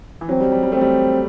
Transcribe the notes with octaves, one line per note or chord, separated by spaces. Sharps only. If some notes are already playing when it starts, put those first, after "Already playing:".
E3
F#3 C4
G3
G3
G3
A3 C4
G3